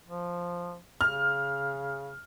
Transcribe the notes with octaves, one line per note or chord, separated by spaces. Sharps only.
F3
C#3 F6